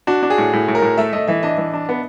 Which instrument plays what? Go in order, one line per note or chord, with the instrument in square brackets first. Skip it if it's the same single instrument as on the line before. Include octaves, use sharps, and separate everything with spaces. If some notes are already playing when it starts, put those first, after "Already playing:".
[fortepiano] D4 [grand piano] F#4
[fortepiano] D4
[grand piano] G#4
[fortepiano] A2
A2
A2
[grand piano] A#4
[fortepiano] A2
[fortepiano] A3 [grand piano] E5
[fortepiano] A3 [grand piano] D#5
[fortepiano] E3 [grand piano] E5
[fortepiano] D4 [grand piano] D#5
[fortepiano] E3
D4
B3